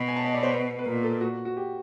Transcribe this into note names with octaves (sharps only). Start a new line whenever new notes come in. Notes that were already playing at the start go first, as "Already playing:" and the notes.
Already playing: B2 B5
G#5
A5
D#5
D5
C5
B4
B4
A#2 A#4
A4
F#4
F#4
G4